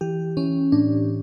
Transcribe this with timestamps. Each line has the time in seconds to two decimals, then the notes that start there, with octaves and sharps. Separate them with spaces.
0.01 E3 G4
0.37 E3 C#4
0.72 A2 D4